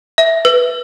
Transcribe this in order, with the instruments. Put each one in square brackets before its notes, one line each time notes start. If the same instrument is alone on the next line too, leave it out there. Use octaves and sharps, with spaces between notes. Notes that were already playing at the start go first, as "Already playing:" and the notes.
[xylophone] E5
B4